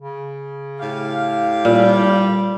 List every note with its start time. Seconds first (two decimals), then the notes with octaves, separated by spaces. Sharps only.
0.01 C#3
0.80 A2 G4 F5
1.65 A#2 G3